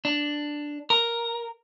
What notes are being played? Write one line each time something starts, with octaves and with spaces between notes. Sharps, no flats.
D4
A#4